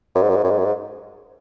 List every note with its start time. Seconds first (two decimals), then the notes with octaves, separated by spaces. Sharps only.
0.15 F#2
0.22 G#2
0.29 F#2
0.36 G#2
0.43 F#2
0.50 G#2
0.58 F#2
0.65 G#2